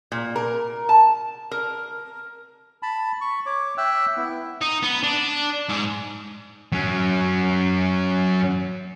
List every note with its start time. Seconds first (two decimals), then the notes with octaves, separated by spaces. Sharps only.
0.12 A#2
0.36 A#4
0.89 A5
1.51 A#4
2.83 A5 B5
3.21 C#6
3.46 C#5 D6
3.78 E5 G5 E6 F#6
4.17 B3 E4
4.61 D#4
4.83 B3
5.03 D4
5.69 G#2
6.72 F#3 C#4